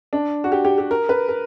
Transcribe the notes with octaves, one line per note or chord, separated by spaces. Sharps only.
D4
F#4
G4
G4
G4
A#4
B4
A#4